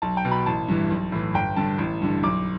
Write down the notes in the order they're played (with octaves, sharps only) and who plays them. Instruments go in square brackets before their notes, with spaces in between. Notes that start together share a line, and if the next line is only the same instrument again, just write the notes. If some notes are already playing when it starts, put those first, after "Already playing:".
[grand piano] B1 A5
G5
B2
B5
A1 A5
G2 E3
B1
A2 E3
G1 G5
G2 D3 A5
A1
G2 D3
B1 D6